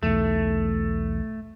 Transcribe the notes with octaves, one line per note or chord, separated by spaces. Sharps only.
B1 E2 A3